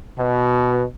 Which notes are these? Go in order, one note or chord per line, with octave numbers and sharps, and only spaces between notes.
B2